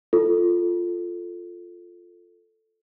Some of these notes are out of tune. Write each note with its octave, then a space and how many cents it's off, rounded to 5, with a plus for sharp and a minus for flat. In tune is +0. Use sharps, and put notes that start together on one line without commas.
F4 +0 A4 +0